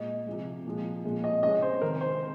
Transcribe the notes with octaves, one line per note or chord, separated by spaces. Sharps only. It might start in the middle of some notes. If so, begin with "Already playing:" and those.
Already playing: A#2 G#3 D#5
C3 F3 G#3
A#2 F3 G#3
A#2 F3 G#3
D#5
C#3 G#3 D#5
C5
C3 D#3 G#3 A#4
C5